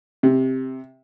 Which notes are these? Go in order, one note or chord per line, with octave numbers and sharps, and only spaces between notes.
C3